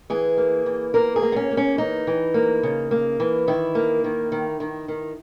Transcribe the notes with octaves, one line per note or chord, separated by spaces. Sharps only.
E3 G#4
A#3
E3
A#3 A#4
G#4
A#3
B3
C#4
A#3
C#4
E3 D#4
E3
A#3
C#3
A#3
E3
D#3 E4
A#3
D#3
D#3
D#3
D#3